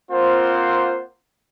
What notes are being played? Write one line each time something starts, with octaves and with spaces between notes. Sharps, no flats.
A#3 C4 F4 C5 F#5